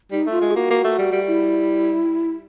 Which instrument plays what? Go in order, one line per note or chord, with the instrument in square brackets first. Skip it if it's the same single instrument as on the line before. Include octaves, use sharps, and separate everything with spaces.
[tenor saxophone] G3 [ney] D#4
[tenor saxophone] A3 [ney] F4
[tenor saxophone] G#3
[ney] G#4
[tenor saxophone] A#3 [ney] F#4
[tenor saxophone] A#3
A3
G3
G3
[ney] E4